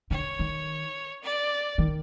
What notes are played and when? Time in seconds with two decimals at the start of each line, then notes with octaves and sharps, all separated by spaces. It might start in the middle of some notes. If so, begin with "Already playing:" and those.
0.11 D3 C#5
0.39 D#3
1.23 D5
1.78 D#3